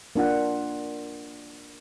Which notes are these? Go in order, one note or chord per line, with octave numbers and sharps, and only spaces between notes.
A#3 D4 F4 F#5